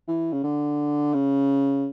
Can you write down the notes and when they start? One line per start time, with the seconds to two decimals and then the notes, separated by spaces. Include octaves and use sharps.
0.08 E3
0.32 C#3
0.43 D3
1.14 C#3